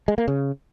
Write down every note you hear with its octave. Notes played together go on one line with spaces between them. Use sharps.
G#3
A#3
C#3